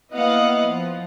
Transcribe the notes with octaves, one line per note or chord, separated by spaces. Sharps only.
A#3 B3 E4 D#5 F5 F#5
F3